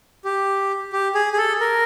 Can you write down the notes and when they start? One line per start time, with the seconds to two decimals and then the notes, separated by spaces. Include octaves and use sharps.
0.24 G4
0.92 G4
1.15 G#4
1.33 G#4
1.37 A4
1.60 A#4